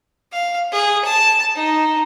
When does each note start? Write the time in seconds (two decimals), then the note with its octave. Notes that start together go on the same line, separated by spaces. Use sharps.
0.32 F5
0.72 G#4
1.05 A5
1.55 D#4